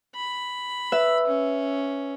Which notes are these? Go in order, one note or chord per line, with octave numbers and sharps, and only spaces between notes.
B5
B4 E5
C#4